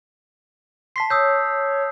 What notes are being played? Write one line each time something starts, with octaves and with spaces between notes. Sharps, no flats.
A5 C6 B6 C7
C#5 D#6 E6 G6